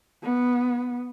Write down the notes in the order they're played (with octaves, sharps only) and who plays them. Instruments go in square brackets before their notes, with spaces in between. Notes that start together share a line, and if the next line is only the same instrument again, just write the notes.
[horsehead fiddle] B3